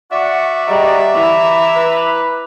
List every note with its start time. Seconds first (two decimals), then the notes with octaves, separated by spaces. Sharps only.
0.12 F#4 D5 E5 F#5
0.67 G3 G#4 D#5 A#5
1.14 E3 E4 A#5 D6
1.76 B4